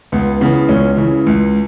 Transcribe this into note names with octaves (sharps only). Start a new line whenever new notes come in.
C#2 B3
C#3 E3 B3
C#2 C#4
C#3 E3
C#2